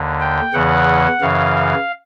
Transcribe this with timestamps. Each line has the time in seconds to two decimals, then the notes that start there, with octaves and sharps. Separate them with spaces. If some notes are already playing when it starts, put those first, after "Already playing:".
Already playing: D#2 D3
0.20 G5
0.53 E2 C#3 E3 F#5
1.21 F#2 C#3 E3 F5